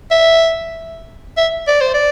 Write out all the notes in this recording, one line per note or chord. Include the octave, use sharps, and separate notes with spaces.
E5
E5
D5
C5
D5